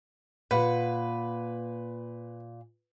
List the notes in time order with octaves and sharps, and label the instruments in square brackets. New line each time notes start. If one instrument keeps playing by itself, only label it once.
[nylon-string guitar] A#2 F#5 [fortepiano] B4